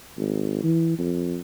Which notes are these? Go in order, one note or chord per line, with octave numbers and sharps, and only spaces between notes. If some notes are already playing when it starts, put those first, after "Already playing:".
G#1
E3
F2